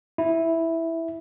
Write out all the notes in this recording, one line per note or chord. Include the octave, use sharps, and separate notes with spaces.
E4